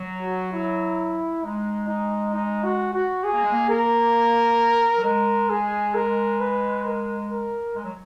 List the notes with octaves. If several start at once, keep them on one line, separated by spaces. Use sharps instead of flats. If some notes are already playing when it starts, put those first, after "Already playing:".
Already playing: F#3
F#4
E4
G#3 D#4
D#4
D#4
F#4
F#4
G#4
A#3
G#3
A#3
A#4
F#3
G#3 A#4
G#4
A#4
B4
A#4
A#4
G#3
F#3